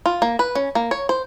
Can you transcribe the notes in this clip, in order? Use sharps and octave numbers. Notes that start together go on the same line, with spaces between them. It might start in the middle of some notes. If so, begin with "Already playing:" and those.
F4
A#3
B4
C#4
A#3
C#5
C5